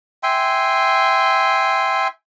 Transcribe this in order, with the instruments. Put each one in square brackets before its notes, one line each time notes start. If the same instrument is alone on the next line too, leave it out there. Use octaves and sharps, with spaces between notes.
[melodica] E5 G5 G#5 C6